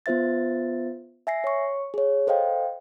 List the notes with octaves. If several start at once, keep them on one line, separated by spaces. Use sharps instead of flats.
B3 F4 C5 E5 A6
E5 G#5 A#6 C7
C#5 C#6
G#4 C#5
A4 C5 D#5 F5 G5